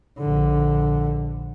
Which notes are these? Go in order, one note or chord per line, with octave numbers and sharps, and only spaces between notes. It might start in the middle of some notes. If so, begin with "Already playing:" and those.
A#1 D3